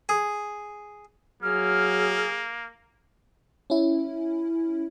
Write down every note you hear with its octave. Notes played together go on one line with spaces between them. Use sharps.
G#4
F#3 A#3 G#4 F6
C#4 E4